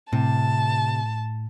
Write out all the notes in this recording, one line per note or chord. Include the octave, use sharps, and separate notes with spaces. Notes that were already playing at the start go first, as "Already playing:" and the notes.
A2 C3 A5